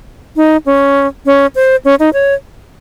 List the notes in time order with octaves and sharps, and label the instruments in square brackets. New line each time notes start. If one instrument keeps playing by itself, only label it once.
[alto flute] D#4
C#4
C#4
C5
C#4
D#4
C#5